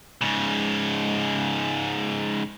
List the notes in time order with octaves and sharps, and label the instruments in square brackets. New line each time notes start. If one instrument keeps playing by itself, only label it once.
[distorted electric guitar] G#2 C#3